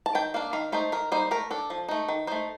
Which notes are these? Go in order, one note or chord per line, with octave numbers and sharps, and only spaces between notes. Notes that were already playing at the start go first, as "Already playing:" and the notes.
A5
D#3 G5
A#3 D4 F5
D#3 F5
A3 D#4 C5
D#3 A#4
G3 A#3 D#4 C5
A3 A#4
D4 A4
F3
A3 D#4
D#3
A3 D#4 C5